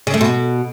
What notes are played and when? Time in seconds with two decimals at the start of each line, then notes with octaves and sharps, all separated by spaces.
0.07 C#3
0.14 A3
0.21 B2